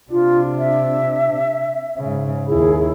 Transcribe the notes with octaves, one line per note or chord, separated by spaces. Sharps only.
C3 D4 F4
E5
G#2 C#3
D#2 E4 G#4